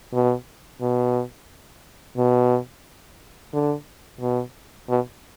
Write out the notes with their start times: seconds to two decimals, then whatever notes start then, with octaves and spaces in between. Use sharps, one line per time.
0.13 B2
0.81 B2
2.17 B2
3.54 D3
4.21 B2
4.89 B2